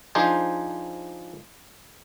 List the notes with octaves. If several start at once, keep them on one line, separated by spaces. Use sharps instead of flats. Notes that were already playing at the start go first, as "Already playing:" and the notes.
F3 D4 D#4 G#4 C5